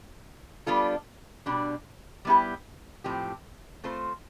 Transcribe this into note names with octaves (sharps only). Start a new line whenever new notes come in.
G3 B3 D4 F4 A4
B2 G3 D4
G3 B3 E4 G4
A2 F3 C4 G4
A3 C4 F4 C5